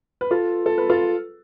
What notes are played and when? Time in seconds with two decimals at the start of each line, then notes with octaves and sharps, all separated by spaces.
0.21 B4
0.31 F4 A4
0.66 A4
0.78 B4
0.90 F4 A4